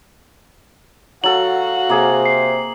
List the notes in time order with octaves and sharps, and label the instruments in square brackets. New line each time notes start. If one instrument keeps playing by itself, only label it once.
[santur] F#3 A4 [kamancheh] F#4 F5 [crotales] F#7
[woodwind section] C3 [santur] A#3 G#4
[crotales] C7